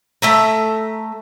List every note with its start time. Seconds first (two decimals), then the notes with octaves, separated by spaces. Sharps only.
0.22 A3 E5 A#5